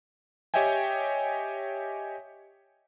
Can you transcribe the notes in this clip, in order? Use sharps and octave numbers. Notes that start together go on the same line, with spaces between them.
G4 C#5 D#5 E5 G5 G#5